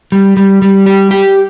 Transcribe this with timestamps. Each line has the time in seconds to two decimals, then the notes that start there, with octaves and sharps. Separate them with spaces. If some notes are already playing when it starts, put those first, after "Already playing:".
0.12 G3
0.37 G3
0.62 G3
0.86 G4
1.11 G4